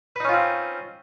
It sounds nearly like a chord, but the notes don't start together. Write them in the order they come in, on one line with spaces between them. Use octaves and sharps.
B4 D#4 C#4 F4 C4